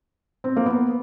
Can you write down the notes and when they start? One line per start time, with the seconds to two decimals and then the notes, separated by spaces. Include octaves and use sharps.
0.44 C4
0.56 A#3
0.66 B3